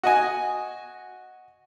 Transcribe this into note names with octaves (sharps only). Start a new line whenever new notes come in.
F#4 D#5 G#5